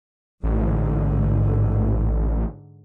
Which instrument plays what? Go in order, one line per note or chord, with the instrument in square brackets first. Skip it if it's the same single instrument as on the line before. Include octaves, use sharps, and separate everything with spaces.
[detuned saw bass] A1 [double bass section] G#2 D3